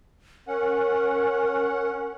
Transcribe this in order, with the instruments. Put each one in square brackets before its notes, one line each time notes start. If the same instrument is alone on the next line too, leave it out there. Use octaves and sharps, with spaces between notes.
[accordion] C#4 F#5 [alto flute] A#4